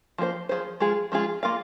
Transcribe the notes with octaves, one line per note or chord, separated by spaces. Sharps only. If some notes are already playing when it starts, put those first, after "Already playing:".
F3 A#3 G#4 C5
F3 A#3 G#4 C5
F3 G#3 F4 G#4
F3 G#3 F4 G#4
A#3 F4 A#4 F5